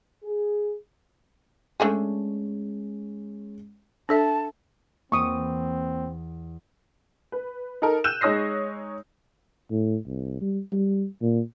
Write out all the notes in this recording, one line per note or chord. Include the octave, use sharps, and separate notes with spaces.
G#4
G#3 A3 C#4 D4 G#4
D4 A4 E5 A5
E2 A#3 C4 C#6 D#6
B4
D#4 A4 A#4
E6 F#6 G6 D#7 E7
G#3 D#4 C#5 D#6 A#6 C7
A2
C2
G3
G3
A#2